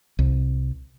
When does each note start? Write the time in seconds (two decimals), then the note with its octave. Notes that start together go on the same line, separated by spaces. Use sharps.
0.19 C2